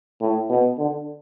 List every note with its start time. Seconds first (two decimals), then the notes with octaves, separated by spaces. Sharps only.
0.21 A2
0.49 B2
0.78 D3